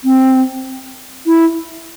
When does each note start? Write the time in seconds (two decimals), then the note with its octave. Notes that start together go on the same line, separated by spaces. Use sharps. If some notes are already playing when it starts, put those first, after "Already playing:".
0.04 C4
1.27 E4